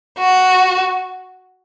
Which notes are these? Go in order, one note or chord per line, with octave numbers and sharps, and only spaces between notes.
F#4